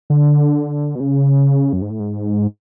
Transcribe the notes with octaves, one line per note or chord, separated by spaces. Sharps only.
D3
B2
C#3
F#2
G#2
A2
G#2